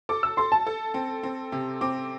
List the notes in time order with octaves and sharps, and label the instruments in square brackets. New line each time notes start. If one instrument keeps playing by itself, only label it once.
[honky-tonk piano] A4 [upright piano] D6
[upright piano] E6
[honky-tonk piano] A4 [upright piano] C6
[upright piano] A5
[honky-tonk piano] A4
C4
C4
C3
[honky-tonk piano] C4 [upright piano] D6